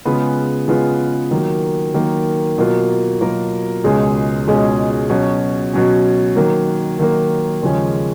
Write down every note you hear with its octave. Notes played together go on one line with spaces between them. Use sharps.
C#3 G#3 B3 F4 B4
C#3 G#3 B3 F4 B4
D#3 F#3 A#3
D#3 F#3 A#3
B2 F#3 A#3 F4 A#4
B2 F#3 A#3 F4 A#4
C#2 B2 G#3 C#4 G#4
C#2 B2 G#3 C#4 G#4
B2 F#3 C#4
B2 F#3 C#4
D#3 F#3 A#3
D#3 F#3 A#3
D#2 C#3 F3 G#3 C#4